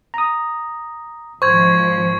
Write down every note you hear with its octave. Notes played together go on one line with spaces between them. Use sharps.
A#5 D#6
G#1 F3 C5 C#6 G#6